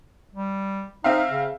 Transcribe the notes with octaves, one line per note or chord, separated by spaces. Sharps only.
G3
C4 D#4 E5 F5
C#3